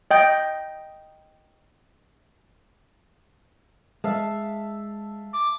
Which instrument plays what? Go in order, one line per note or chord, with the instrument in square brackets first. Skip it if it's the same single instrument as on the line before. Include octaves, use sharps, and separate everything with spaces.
[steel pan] D#5 G5
[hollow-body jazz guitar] G#3 [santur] E5 F5 A5
[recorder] D6